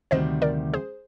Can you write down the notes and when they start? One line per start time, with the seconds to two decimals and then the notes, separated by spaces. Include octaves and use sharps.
0.11 D2 C3 D#3 G3 C5 D#5
0.42 A#4 D5
0.74 G#4 C5